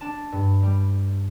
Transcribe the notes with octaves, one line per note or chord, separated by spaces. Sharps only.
D4 A5
G2
G3